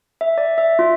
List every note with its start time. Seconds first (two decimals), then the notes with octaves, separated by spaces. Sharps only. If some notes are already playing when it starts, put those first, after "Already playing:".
0.21 E5
0.38 D5
0.58 E5
0.79 F4